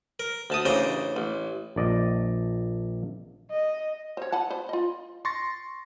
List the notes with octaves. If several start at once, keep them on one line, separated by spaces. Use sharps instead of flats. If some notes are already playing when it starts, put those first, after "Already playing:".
A#4
D2 A5 D#6
A1 C#3 D4 C5 A#5
A1
A#1 D5 D#5
D#5
C5 C#5
B4 F#5 A5
B4 C5
F4 D#5
C6 C#6 A6 A#6